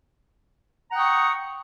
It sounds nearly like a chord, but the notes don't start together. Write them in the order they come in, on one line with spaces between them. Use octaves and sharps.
A#5 F#5 G5 D#6 C#6